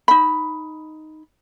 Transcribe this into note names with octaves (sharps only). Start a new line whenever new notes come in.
D#4 B5